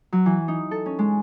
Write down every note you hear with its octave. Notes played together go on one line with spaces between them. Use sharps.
F#3
E3
D#4
A4
C#4
G#3